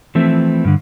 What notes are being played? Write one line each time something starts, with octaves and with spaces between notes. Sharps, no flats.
E3 F3 A3 C4 E4
G2 D3